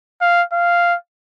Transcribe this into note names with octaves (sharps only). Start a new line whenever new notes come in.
F5
F5